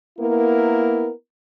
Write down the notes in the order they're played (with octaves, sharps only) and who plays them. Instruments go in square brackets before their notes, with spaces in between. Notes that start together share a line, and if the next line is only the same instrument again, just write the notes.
[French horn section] A#3 B3 E4 A#4